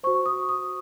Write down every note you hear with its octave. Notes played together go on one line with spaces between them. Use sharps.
F#4 C5 C#6
D#6
D#6